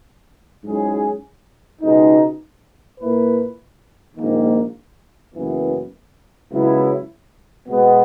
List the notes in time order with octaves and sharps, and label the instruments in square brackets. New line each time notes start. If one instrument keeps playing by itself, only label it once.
[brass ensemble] G#2 F#3 C#4 E4 G#4
C#2 B2 G#3 D#4
A#2 A#3 E4 B4
A#1 G#2 D#3 A#3
F#1 F#2 E3 B3
C#2 C#3 F#3 B3 E4
B2 G#3 B3